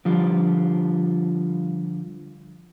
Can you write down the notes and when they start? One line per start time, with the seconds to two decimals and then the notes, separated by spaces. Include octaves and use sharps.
0.05 D3 F3 G3 F4